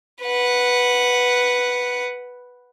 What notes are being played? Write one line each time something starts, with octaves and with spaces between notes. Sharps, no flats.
B4 F#5